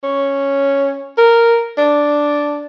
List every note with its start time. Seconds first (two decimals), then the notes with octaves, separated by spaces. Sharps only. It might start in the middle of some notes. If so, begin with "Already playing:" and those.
0.03 C#4
1.18 A#4
1.78 D4